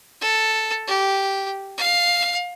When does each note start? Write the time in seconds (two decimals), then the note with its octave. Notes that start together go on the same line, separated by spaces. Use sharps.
0.21 A4
0.88 G4
1.78 F5